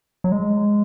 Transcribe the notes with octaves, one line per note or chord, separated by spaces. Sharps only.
F#3
G#3